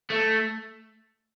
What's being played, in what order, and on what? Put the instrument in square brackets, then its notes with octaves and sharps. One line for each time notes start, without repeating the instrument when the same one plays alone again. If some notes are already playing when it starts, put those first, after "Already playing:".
[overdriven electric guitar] A3